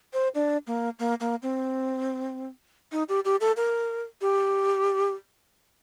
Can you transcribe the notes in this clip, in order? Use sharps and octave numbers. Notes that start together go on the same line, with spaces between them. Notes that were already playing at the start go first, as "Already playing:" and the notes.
C5
D4
A#3
A#3
A#3
C4
D#4
G4
G4
A4
A#4
G4